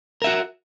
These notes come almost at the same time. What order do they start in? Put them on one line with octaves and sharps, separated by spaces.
A#4 E5 F#4